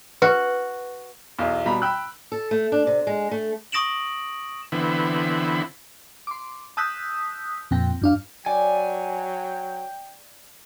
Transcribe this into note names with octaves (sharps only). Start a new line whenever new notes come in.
F#4 B4
B1 E2
B2 G3 A#5 B5
G5 B5 E6 F#6
A4
A3
D4
C3
G#3
A3
C#6 D#6 A#6 D7 E7 F#7
D3 E3 B3 C4 E4
C6 D6
A5 D#6 E6 F#6 G6 B6
F2 A#2 C4 G5 A#6
F#2 D4 F5
F#3 D5 G5 G#5